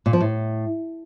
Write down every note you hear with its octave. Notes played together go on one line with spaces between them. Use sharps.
A#2
F3
A2